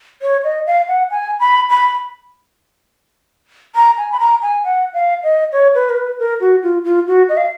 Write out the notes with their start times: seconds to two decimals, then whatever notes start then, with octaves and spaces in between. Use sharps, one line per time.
0.22 C#5
0.44 D#5
0.67 F5
0.88 F#5
1.11 G#5
1.40 B5
1.70 B5
3.75 A#5
3.98 G#5
4.12 B5
4.20 A#5
4.42 G#5
4.64 F#5
4.94 F5
5.24 D#5
5.52 C#5
5.75 B4
5.90 A#4
5.97 B4
6.19 A#4
6.41 F#4
6.63 F4
6.84 F4
7.08 F#4
7.29 D#5
7.37 F5